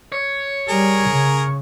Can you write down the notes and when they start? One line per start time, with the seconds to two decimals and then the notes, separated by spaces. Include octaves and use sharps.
0.12 C#5
0.69 G3 G#4 A#4
1.09 C#3